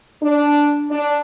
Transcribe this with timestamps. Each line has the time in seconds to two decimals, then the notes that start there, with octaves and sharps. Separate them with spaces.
0.21 D4
0.90 D4